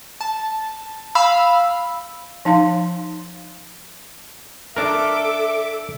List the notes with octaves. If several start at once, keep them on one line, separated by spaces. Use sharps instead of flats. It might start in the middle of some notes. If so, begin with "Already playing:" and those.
A5
F5 B5 E6
F3 D#4 F5 C6
D4 A4 A#4 E5 D6